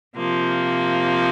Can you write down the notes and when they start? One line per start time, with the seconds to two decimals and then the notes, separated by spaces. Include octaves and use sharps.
0.16 C3 F3 A#3